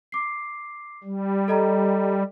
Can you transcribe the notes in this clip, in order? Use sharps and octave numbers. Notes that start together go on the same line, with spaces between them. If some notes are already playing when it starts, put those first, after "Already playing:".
D6 C7
G3
A4 D#5 A#5